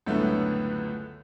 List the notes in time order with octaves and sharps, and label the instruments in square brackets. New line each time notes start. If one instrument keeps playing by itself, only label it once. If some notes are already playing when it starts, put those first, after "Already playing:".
[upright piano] C#2 F#2 A2 D3 A3 B3